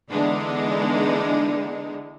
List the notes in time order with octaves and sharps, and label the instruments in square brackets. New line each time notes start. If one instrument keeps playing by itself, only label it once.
[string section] D3 E3 G#3 B3 D4 D#4